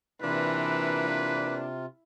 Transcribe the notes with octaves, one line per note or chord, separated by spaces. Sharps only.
C3 E3 A#3 D4 F4 B4